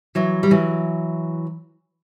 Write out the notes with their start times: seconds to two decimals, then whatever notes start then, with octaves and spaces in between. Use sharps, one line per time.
0.15 E3 F#3
0.43 G3
0.51 E3 F#3